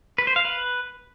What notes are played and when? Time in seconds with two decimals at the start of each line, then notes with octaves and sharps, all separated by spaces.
0.18 B4
0.27 C5
0.36 F5
0.45 B4